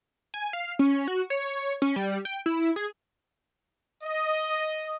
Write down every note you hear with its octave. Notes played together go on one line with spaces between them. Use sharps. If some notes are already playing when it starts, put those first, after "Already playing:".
G#5
F5
C#4
F#4
C#5
C#4
G3
G5
E4
G#4
D#5